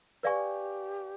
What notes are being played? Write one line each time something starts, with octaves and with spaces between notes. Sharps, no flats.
G4 A4 B4 D5 F5 G#5 C#6